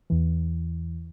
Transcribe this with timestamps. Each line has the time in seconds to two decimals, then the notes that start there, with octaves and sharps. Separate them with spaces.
0.10 E2 E3